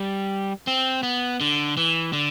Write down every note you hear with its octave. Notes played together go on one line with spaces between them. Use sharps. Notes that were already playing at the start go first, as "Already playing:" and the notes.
Already playing: G3
C4
B3
D3
E3
D3